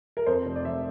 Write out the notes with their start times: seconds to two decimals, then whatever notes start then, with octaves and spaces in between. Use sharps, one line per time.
0.17 A#4
0.26 F2 C5
0.46 F1
0.56 D5
0.65 F1 E5